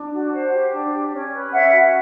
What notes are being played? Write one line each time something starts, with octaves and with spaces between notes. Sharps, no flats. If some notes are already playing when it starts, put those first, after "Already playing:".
Already playing: D4
F#4
C5
G4
D4
G4
C#4
B4
C#4 E5 F#5
F#4